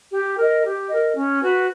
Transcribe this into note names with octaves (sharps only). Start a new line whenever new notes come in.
G4
A#4 D#5
G4
A#4 D#5
C#4
F#4 B4